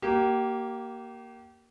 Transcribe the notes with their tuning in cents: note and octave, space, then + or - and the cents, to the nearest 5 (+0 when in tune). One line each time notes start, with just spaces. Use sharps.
A#3 +0 G4 -30